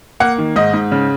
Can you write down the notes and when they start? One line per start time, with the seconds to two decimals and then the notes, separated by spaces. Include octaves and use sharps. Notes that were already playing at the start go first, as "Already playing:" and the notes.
0.20 A#3 F#5
0.38 D#3
0.56 G#2 D#5
0.74 G#2
0.92 C#3